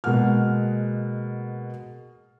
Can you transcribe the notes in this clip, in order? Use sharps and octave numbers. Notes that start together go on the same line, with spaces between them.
B2 G#3 A#3 F#5 F6